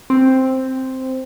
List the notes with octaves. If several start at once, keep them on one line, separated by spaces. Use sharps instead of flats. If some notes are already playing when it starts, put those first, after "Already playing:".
C4